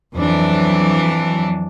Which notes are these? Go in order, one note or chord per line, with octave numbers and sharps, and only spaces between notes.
F2 E3 F#3 D4